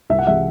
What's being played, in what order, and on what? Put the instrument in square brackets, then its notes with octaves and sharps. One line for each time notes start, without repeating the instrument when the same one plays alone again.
[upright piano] C2 E5
F#5
C3 E3 G#3 E5